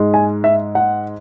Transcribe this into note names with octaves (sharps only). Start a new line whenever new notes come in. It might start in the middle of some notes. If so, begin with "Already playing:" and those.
Already playing: G#2 G#3
G#5
E5
F#5